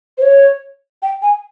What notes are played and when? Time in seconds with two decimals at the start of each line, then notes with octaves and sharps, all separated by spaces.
0.17 C5
0.22 C#5
1.02 G5
1.22 G#5